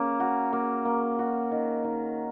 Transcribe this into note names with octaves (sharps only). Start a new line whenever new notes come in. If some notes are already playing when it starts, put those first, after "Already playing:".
Already playing: A#3 C#4
F#4
A#3
A#3
F#4
D#3
D#3